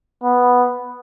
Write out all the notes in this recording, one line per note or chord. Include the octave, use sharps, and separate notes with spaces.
B3